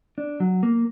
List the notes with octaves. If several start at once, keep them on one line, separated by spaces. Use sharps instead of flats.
D4
F#3
A#3